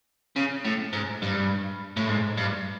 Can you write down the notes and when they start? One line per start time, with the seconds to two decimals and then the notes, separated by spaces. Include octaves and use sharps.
0.36 C#3
0.64 A2
0.93 G#2
1.22 G2
1.97 A2
2.09 G#2
2.37 G2